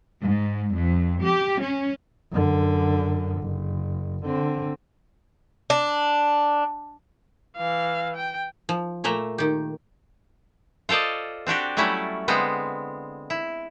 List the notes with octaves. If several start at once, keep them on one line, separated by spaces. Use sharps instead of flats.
G#2
F2
G4
C#4
F#2 D3
F#1
D3 C4
D4
E3 F5
G5
F3
A#2 A3 A#3 E5 A#5
D#3 G4
F4 A4 C5 D5 D#5
C4 D4 F#4 G4
F#3 G3 A3 C#4 E4
D3 G#3 B3 C4
E4